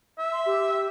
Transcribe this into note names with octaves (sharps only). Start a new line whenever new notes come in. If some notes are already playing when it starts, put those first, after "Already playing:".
E5
C6
G4